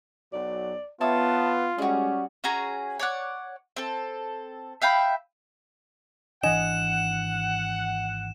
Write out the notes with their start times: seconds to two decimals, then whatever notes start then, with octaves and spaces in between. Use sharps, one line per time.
0.33 B1 F#3 D5
1.01 B3 F4 C#5 E5 A5 D#6
1.78 G3 G#3 C#4 F#4 G#4
2.44 C#4 F#4 G#4 A#5
2.99 C#5 D5 F#5
3.76 C4 A4
4.82 E5 F5 G5 B5
6.44 G#1 E3 D4 D#5 F#5 G#5 E7